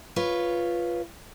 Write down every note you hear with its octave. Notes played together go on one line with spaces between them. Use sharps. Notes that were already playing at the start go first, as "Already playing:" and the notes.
F4 B4 C#5